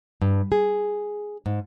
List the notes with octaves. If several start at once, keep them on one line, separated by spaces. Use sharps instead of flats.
G2
G#4
G#2